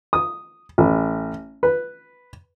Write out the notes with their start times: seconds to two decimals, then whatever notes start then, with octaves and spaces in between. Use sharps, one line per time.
0.13 D#6
0.78 A1
1.63 B4